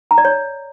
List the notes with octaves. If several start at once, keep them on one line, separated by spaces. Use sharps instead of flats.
A#5
D5
C#5